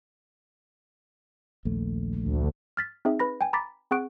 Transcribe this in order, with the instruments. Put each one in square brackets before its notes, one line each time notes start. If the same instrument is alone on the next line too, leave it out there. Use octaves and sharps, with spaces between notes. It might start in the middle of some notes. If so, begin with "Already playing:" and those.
[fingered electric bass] A#1 D#2 A3
[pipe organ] D2
[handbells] F6 A6 B6
C4 D#4 G#4 E5
B4 B5 A#6
G5 G#5
A#5 B5 D6 A6 B6
C4 G#4 F#5 C#6 F#6 D7